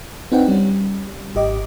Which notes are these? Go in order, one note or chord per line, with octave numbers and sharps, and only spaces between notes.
C4 D4 D#4 B4 F#5 G5
G3 C#4
G#1 G4 D#5 D6